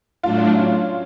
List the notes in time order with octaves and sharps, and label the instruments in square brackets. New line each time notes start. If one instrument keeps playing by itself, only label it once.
[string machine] A2 F#3 A3 D4 [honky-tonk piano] F4
[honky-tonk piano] C#4